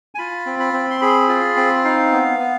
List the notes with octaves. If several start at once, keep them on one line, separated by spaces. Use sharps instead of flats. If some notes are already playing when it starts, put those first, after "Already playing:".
G#5
F4 B5
C4
B5
C4
C6
G#4 B5
F4
C4
D#4 F5
B3
B3